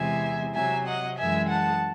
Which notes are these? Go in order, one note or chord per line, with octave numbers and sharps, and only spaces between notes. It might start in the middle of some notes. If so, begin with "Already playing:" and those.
Already playing: E2 C3 E3 G#3 E5 G#5
C3 F#3 E5 G#5
D#5 F#5
F#2 E3 G#3 E5 G#5
F#5 A5